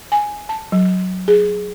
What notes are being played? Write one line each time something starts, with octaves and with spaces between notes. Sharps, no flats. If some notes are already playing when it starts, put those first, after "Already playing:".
G#5
A5
F#3
G#4